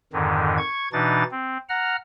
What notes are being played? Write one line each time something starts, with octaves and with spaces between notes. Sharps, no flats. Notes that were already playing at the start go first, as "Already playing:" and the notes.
F2 G#2 D3 D#3
C#6 G#6
B2 E3 D4 D#4 A6
C4
F#5 A#5 F6